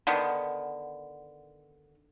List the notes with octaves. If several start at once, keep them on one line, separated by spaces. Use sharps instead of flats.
D3 D#3 B3